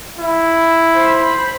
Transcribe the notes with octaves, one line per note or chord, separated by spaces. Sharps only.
E4
C5 B5